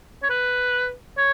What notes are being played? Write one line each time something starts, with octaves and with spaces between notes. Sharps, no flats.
C#5
B4
C#5